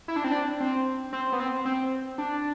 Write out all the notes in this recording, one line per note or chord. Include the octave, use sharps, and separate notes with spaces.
E4
D4
C4
D4
C4
C4
B3
C4
C4
D4